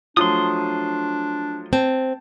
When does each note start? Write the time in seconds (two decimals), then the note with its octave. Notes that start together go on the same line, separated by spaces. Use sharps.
0.17 F3 F#3 A3 D4 C6 D#6
1.73 C4 A5